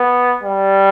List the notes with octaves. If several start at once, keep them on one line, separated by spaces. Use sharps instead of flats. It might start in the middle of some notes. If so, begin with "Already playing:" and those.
Already playing: B3
G3